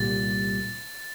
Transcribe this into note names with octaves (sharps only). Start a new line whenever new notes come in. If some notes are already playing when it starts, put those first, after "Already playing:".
Already playing: C2 A#2 G3 A6